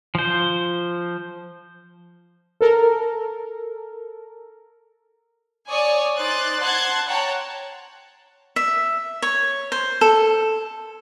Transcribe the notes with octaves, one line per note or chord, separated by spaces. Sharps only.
F3 C5
A4 A#4
C#5 D5 G#5 C#6 D#6
D#4 C5 D5 F#6 A6
F#5 A5 C6 F#6 G#6 A6
C#5 F#5 G5 A5 A#5
E5
C#5
C5
A4